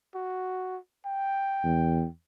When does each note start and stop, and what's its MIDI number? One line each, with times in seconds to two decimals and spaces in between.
0.15 0.78 66
1.06 2.08 79
1.64 2.05 40